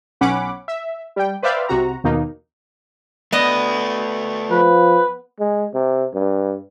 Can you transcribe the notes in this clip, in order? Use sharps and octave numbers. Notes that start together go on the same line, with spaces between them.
B1 C#4 F#5 B5 D6
E5
G3 G5
B4 C5 D5 E5 F5 G5
C2 C3 F#4 A#5
D#2 B2 D#3 A#3 D#4
A3 B3 D5 D#5
F3 B4
G#3
C3
G2